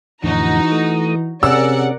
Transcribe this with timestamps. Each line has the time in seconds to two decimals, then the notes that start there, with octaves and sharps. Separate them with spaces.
0.24 F2 A2 D3 E3 D#4 F#4 A#5
0.72 A3 D#6
1.43 C3 C#4 G#4 A#4 D5 F#5 E6